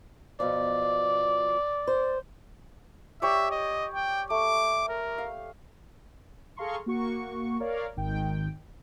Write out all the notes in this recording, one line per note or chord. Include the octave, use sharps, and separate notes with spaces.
B2 F3 D5
C5
G4 C#5 D5 E5
D#5
G5
A3 D6
A#4
F5
G#4 A4 F5 A#5 C6 C#6
A#3 F#4 C#6
A#4 C#5 D5 F5
G#1 D#3 G5